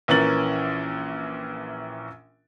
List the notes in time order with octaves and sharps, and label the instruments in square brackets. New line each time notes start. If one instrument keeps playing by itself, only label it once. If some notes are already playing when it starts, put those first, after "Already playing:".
[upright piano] A#1 E3 C#4 A#4 A6 F#7